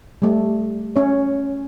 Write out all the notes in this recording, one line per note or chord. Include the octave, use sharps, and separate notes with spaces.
G3 A3
C#4 C#5